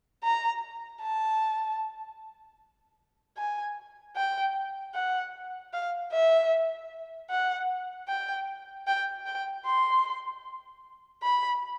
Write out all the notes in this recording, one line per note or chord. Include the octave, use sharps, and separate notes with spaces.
A#5
A5
G#5
G5
F#5
F5
E5
F#5
G5
G5
G5
C6
B5